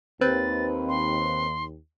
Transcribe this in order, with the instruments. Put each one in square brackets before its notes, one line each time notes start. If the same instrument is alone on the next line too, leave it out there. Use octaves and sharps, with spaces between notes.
[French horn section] D#2 [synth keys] C4 B4 [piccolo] A6
[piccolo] C6